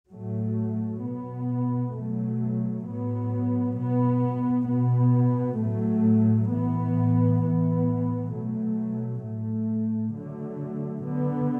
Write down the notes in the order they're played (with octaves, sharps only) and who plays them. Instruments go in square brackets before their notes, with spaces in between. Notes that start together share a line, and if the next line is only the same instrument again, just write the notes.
[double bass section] A2 F#3 A3
B2 B3
B2 F#3 A3
A2 F#3 B3
B2 B3
B2 B3
A2 F#3 A3
A2 E3 B3
A2 E3 B3
B2 F#3 A3
A2 A3
D3 F#3 A3
D3 B3